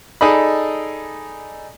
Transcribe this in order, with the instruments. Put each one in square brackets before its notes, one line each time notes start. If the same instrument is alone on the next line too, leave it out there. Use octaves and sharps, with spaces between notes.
[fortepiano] D#4 G#4 A4 D5 D#5 B5